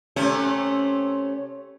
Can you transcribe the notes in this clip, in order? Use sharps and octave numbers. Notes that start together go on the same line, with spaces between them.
C3 A3 C#4